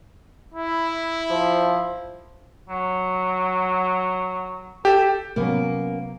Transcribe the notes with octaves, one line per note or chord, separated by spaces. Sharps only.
E4
F3
F#3
G4 A4
C3 F#3 A#3 B3 C#4